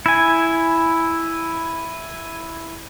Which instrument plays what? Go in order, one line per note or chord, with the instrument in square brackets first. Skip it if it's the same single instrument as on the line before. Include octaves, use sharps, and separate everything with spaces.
[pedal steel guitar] E4 G#5